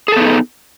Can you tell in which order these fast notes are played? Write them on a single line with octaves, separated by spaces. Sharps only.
G#4 A4 B3 D#4